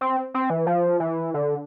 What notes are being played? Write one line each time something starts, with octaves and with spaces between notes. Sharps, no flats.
C4
C4
E3
F3
E3
D3